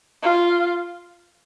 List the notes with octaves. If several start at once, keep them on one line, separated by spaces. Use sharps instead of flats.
F4